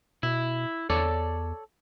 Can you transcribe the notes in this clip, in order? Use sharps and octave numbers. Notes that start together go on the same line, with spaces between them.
B2 E4
E2 A4 C#5 D5